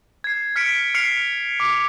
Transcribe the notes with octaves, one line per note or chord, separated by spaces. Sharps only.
G#6 C7
F6 B6 C#7 D7
F6 C7 C#7 F7
D6